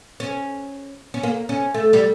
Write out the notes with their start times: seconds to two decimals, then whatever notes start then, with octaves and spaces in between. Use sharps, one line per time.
0.20 C#4
1.14 C#4
1.23 A#3
1.49 C#4
1.74 A3
1.93 G3